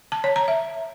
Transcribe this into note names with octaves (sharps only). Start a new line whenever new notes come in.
A5
C#5
A#5
E5